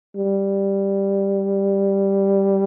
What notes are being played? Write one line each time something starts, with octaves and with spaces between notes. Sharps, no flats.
G3